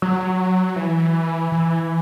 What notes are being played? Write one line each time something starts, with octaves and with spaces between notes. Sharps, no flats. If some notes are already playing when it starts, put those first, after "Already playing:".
F#3
E3
E3